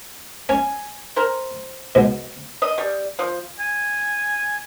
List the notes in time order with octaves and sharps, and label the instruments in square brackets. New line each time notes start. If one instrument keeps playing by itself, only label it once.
[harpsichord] C#4 [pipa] G#5
[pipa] A#4 C5
[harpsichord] G#2 B2
[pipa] D#5
G3
F3
[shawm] G#5